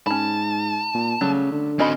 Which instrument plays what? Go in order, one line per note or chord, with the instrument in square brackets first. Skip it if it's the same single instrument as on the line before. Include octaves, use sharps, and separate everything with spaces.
[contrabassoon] G#2 [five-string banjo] C#4 B5 [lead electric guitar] A5
[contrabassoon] A#2
[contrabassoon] C#3 [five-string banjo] F#3 G3 A3
[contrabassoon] D3
[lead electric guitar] C4 F#4 [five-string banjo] C#4 D#5 B5